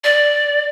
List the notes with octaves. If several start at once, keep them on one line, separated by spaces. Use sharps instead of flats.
D5